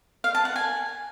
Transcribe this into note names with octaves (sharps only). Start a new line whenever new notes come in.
F5
A5
F#5
G#5